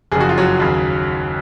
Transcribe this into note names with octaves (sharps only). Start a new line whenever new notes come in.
F#1 F2 C#3 G#4
F#4
F4
F#3 F#4
D#2 C#3